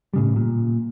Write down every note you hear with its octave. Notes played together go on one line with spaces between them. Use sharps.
A2 C#3 G3
A#2